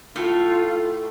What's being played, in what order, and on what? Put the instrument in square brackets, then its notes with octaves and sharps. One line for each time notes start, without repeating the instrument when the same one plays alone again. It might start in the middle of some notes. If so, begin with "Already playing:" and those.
[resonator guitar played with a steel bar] A2 A3 [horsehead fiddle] F4